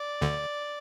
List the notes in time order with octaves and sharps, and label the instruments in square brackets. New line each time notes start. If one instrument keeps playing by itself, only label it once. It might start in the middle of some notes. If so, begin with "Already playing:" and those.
Already playing: [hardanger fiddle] D5
[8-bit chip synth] D2 D3